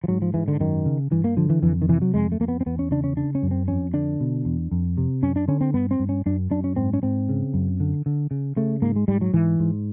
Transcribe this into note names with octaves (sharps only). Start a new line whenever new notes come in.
F3
G#2 F#3
F3
G#2 E3
D3
F#2 D#3
C#3
G2 E3
A#3
D3 F3
E3
F2 E3
D#3
C3 E3
F#3
F2 G#3
A3
F2 A#3
B3
C4
E2 B3
C#4
C#3 D4
C#4
C#3 D4
C#4
F#2
C4
F2 C#4
D3 D4
B2
E2
F2
C3
F#2 C#4
D4
D3 C#4
C4
G2 B3
C4
G2
C#4
F#2 D4
F#2 D4
C#4
G#2 C4
C#4
G#2 C4
C#3
F#2
D3
D3
C#3
C#3 A3
G#2 A#3
G#3
G#2 G3
F#3
G#2 E3
G#2